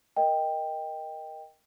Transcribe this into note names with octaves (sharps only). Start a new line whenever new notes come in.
A#4 D#5 G5